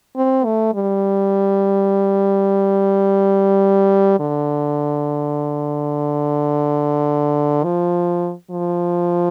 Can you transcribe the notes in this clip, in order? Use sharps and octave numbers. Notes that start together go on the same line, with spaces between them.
C4
A3
G3
D3
F3
F3